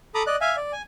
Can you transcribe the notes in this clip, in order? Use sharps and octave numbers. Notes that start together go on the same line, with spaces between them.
A4 A#5 B5 D6 D#6
D5 D#5 F#6
E5 F5 G#5
D5
G#5